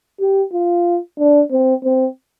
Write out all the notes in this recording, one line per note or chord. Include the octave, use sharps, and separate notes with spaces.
G4
F4
D4
C4
C4